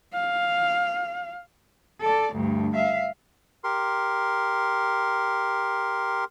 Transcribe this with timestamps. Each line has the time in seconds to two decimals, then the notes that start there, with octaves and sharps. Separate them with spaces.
0.14 F5
2.01 A4 D5
2.34 D2 G2
2.75 E5 F5
3.64 G4 A#4 C6